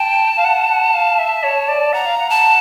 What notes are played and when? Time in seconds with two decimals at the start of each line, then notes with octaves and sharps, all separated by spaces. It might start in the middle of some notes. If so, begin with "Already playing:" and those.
Already playing: G5 A5
0.37 F5
0.45 F#5
0.69 F#5
0.94 F5
1.18 E5
1.43 C#5
1.68 D5
1.93 F#5 A#5
2.06 F5
2.18 F#5
2.30 A5